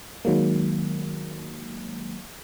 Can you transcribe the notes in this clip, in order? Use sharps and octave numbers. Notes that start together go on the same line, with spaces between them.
D#3 F#3 G#3 A#3